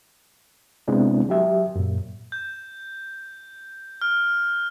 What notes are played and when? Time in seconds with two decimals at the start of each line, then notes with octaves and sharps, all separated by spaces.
0.88 C3 G#3 B3 C4 D4 E4
1.29 F#3 G4 E5
1.76 F#2 A#2
2.32 G6
4.01 F6